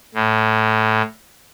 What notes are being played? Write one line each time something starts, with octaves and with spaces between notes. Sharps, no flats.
A2